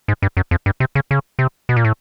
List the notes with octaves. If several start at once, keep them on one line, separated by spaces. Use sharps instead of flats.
G#2
G2
F#2
F2
G2
C3
C#3
C#3
C3
B2
A#2
A2